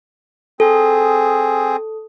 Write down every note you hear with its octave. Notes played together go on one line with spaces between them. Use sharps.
C4 G#4 A4